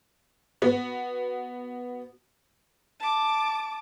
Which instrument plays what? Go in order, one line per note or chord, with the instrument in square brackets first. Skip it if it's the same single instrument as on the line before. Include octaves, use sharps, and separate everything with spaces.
[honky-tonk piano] B3 F#4
[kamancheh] A5 D6